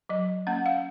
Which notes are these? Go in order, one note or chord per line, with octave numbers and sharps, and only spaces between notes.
F#3 D#5
A#3 C#4 F#5
F5